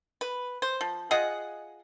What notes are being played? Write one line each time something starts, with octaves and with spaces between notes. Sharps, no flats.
B4
C5
F3
F4 G#4 D#5 F#5